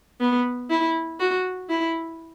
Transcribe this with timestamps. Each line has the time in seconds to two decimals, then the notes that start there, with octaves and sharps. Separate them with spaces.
0.20 B3
0.70 E4
1.20 F#4
1.70 E4